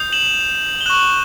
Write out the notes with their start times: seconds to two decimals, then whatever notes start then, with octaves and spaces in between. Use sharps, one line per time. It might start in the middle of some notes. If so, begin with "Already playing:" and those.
Already playing: D#6 G6
0.13 E7 F#7
0.81 G7
0.86 F#6 E7 F#7
0.90 C#6